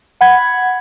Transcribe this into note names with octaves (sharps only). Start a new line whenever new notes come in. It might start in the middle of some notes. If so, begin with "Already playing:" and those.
F#5 B5 G#6